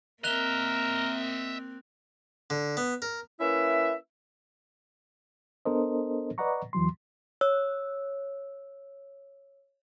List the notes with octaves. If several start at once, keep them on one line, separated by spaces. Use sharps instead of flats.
A#3 C4 A#4 D#5 E5 F#6 F7 G7
D3
B3
A#4
A#3 C#4 E4 B4 E5
B3 D4 A4 A#4 C5 D#5
B4 D5 D#5 F#5 A#5 C#6
E2 E3 F#3 C6
C#5 E6